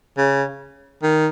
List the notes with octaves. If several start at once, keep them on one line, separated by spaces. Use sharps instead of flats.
C#3
D#3